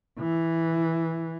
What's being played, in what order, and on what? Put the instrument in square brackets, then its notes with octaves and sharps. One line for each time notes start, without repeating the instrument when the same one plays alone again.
[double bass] E3